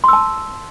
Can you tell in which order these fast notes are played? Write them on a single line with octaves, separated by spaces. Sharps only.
C6 E6 A5